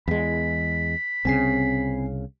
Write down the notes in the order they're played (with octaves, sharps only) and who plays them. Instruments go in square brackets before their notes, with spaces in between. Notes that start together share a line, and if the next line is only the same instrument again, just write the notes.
[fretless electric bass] E2 G#3 [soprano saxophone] B5
[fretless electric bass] C2 C#3 [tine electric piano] C4 G#5 C7